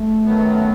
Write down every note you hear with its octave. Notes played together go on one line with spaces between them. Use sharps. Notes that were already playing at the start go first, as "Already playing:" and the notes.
Already playing: A3
F#2 D#3 F#3 B3